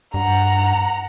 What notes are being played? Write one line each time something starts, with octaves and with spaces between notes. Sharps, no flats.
G2 F#5 A#5